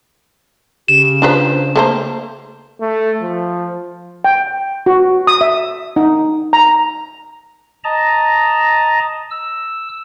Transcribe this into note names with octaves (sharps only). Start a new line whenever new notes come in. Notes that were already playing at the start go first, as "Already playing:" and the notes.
C#3 G4 E7
D4 F4 B4 C5
A3 A#3 C5
A3
F3
G5
F#4
D#6
E5
D#4
A#5
D#5 A5 A#5
E6